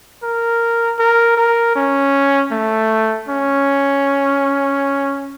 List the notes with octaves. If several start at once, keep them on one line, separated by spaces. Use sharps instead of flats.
A#4
A#4
A#4
C#4
A3
C#4